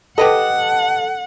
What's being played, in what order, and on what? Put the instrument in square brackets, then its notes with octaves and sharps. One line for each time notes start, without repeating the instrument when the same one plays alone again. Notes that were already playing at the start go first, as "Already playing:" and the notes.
[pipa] G4 B4 D#5 [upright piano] A4 [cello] F#5